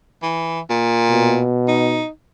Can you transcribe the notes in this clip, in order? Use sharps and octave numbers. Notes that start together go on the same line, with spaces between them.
E3
A#2
B2
D#4